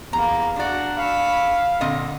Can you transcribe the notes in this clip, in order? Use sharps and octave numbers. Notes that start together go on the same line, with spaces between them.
E2 A#3 A#5
D4 F#4 A#4 D5
F5 B5 C#6 E6
A#2 D3 C4 D#5